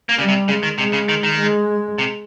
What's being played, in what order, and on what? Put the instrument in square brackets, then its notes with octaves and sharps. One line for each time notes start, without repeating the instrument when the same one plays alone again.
[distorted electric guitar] A#3
[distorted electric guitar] C#3 [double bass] G3
[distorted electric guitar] C3
[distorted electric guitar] C#3 [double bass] G#3
[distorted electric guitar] D#3
[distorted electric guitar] C3 [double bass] G#3
[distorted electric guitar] C#3
D#3
D#3
[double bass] G#3
[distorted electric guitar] C3